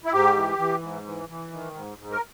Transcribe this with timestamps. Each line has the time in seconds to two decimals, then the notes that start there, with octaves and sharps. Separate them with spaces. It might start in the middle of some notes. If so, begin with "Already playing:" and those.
0.05 E4
0.13 G#2 G4
0.37 E3
0.59 E3
0.82 G#2
1.06 E3
1.29 E3
1.52 D#3
1.74 G#2
1.98 G#2
2.12 A#4